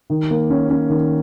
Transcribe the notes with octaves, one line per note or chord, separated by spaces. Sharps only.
D#3
A#3
C#4
C#4
D#3